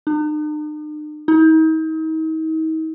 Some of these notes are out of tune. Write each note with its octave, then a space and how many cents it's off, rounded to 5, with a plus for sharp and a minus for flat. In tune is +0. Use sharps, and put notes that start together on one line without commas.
D#4 -45
D#4 +40